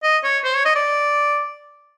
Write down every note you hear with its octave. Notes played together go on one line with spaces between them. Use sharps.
D#5
C#5
C5
C#5
D#5
D5